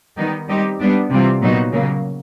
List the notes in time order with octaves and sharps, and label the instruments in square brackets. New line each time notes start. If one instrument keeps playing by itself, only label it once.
[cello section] D#3 G3 B3 D#4
G3 C4 D#4 G4
G3 B3 D4
C3 E3 G3 C4 F4
A#2 F#3 B3 D#4 F#4
C#3 F#3 A#3